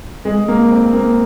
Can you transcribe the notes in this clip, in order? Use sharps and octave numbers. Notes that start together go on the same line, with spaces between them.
G#3
A#3
C4
A#3